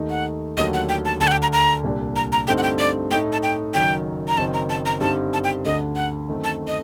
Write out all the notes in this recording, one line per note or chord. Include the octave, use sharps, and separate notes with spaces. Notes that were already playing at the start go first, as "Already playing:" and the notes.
Already playing: D#2 D#3 A3 D#4
F#5
D#2 D3 F#3 A3 D#4 D#5
F#5
G5
A5
D2 D3 A3 D4 A5
F#5
G5
A#5
A#5
C2 A#2 G3 D4
A#5
A#5
G2 D3 A3 C4 D#4 G5
F#5
G5
D5
A2 A3 D#4 G5
A5
G5
F#1 F#2 D#3 F#3 G5
A#5
F#1 F#2 D#3 F#3 C4 A5
A#5
A5
A#5
G2 D3 G3 C4 D#4 A5
A5
G5
D2 D3 A3 D4 D#5
F#5
F#2 D#3 A3 C4
A5
D#5